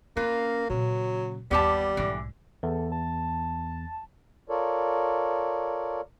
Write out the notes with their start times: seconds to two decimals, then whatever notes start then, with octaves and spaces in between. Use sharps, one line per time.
0.17 A#3 C#4 F4 B4
0.70 A#2 C#3 F#3
1.51 G1 D#2 G3 B3 G4 A5
1.97 B1 G#2 D3 E3
2.63 E2 A4
2.92 A5
4.49 F4 A4 A#4 C#5 D5